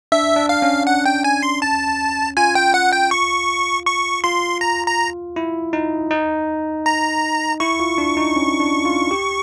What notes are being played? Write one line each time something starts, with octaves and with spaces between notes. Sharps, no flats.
D4 E5
D4
F5
C#4
F#5
G5
G#5
C6
A5
F4 G#5
G5
F#5
G5
C#6
C#6
F4 C6
A#5
A#5
E4
D#4
D#4
A#5
E4 C#6
F4
D4
D#4
C#4
D4
F4
G4